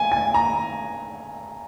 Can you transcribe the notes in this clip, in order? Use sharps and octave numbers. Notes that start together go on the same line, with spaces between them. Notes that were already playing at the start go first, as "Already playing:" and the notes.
Already playing: G#5
G#5
A#5